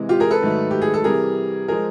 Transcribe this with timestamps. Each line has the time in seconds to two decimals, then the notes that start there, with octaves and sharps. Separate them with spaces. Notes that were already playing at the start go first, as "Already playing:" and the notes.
Already playing: C3 E3 G#3
0.09 F4 G4
0.20 G#4 A#4
0.31 A4 B4
0.42 G#2 D#3 F#3 A3
0.71 G4
0.82 G#4
0.94 A4
1.04 C3 E3 G3 G#4 A#4
1.68 F3 G#3 G#4 A#4